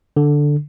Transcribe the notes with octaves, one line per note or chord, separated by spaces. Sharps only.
D3